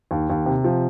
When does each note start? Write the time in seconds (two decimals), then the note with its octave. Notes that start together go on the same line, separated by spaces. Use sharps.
0.11 D#2
0.30 D#2
0.46 C3
0.64 F3